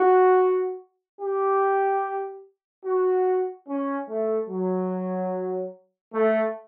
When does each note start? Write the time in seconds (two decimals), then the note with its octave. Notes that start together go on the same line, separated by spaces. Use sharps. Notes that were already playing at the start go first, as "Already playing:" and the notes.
Already playing: F#4
1.21 G4
2.85 F#4
3.68 C#4
4.09 A3
4.49 F#3
6.14 A3